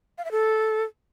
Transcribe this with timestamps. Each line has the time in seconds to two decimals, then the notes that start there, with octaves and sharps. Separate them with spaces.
0.18 F5
0.25 E5
0.31 A4